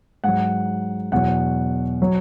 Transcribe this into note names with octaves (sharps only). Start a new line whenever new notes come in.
G#2 F#3 F#5
E2 B2 F#3 F#5
F#3